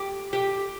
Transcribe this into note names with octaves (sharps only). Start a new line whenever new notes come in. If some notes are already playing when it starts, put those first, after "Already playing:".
Already playing: G4
G4